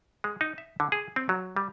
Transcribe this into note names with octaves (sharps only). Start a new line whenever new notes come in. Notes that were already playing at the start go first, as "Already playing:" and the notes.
G#3
D#4
E5
D3
G#4
C4
F#3
G3